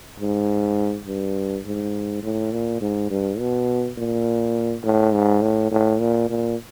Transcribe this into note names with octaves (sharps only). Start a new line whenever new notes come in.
G#2
G2
G#2
A2
A#2
G#2
G2
B2
A#2
A2
G#2
A2
A2
A#2
A#2